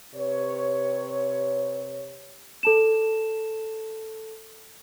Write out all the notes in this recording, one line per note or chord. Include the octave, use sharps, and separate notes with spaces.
C3 B4 C#5
A4 A5 E7